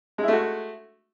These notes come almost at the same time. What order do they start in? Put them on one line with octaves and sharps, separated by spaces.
G#3 E4 A3 F#4